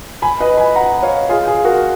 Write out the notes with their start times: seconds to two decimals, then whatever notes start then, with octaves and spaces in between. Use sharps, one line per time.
0.22 G#5 B5
0.41 B4 D#5
0.57 G#5 B5
0.76 F#5 A#5
1.03 C#5 F5
1.29 F4 G#4
1.47 F4 G#4
1.65 F#4 A#4